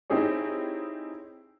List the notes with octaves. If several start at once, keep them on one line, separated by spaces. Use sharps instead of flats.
C4 D#4 E4 G4 G#4 C#5